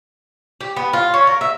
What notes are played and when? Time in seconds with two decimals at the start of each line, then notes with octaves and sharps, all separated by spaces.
0.61 G4
0.77 B3
0.93 F4
1.14 C#4
1.27 A#4
1.41 E5